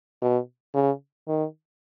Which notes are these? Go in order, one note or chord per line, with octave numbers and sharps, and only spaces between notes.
B2
C#3
D#3